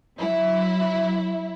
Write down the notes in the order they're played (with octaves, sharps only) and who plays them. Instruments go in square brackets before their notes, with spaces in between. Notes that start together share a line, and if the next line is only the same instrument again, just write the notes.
[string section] F#3 E4